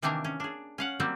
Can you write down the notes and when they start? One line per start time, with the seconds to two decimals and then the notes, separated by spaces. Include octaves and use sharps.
0.02 C3 D#3 E3 A#3 D4 A#4
0.24 C#4
0.40 D4 G#4
0.78 C#4 F5 F#5
1.00 F#3 G3 A#3 C4